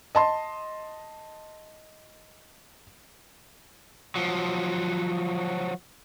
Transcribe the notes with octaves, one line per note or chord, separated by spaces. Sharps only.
D#5 A5 C6
F3 F#3